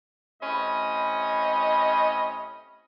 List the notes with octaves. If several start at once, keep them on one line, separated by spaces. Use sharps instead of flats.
A2 C3 C#4 D#5 B5